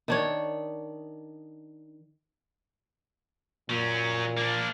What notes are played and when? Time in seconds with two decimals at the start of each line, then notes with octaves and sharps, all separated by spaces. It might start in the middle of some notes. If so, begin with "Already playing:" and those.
0.08 D#3 D4 C#5
3.70 A#2 F#3 C#4
4.37 A#3 D4